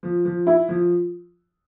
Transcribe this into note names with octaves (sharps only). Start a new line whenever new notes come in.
F3
F3
E4
F3